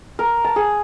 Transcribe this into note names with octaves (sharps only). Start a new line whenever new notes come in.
A#4
A5
G#4